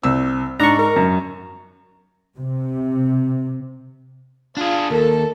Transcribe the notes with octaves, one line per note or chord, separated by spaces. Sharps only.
C2 C4 E6
G#2 D4 A#5 C#6
A#4
F#2
C3
D4 F4 G#4
D#2 A4 A#4